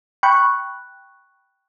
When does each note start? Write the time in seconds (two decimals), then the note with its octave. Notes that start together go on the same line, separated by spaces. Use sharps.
0.23 G5 B5 C#6 F#6